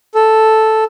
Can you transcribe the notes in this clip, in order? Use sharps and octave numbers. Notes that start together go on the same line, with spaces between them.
A4